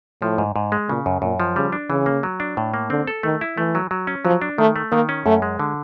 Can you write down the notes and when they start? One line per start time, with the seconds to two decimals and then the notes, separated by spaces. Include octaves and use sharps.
0.21 A2 F3
0.38 G#2
0.56 G#2
0.72 G#3
0.88 A#2 C#3
1.06 F#2
1.22 F#2 A#2
1.40 F3
1.56 C#3 G3
1.73 D4
1.90 C#3 E3
2.06 A#3
2.23 F#3
2.40 D4
2.57 A2
2.74 A#3
2.90 D3 C4
3.07 A4
3.23 D#3 A3
3.41 E4
3.58 E3 A3
3.75 F#3
3.91 F#3
4.07 C#4
4.25 F3 F#3
4.42 D4
4.58 D#3 A3
4.76 A3
4.92 D#3 A#3
5.09 C#4
5.26 F#2 A3
5.42 G#3
5.59 D3